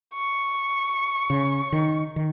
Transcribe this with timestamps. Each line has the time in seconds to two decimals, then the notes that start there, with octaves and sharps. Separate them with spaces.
0.15 C#6
1.30 C#3
1.72 D#3
2.16 D#3